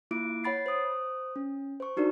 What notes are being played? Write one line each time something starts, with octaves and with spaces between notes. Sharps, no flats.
A#3 E4 F4 D6 D7
C#5 F#5 B5 A6 C7
C5 D#6
C#4
C5 C#6
D4 D#4 F#4 A#4 D5